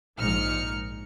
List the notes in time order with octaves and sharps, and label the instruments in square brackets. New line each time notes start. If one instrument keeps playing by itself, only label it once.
[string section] A#1 G#2 D#4 F6 C#7